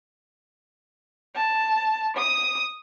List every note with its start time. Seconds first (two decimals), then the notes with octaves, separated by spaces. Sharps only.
1.35 A5
2.17 D#6